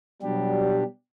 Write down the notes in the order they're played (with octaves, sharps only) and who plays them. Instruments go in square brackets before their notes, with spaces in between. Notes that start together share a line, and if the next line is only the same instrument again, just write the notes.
[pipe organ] B2 D4 G4 [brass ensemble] F#3 G3